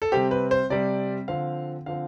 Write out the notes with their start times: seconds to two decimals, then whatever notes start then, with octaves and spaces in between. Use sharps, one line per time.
0.02 A4
0.12 C3 G3 C4 G4
0.31 B4
0.51 C5
0.70 C3 G3 C4 D5
1.28 D3 F3 C4 F5
1.86 D3 F3 C4 F5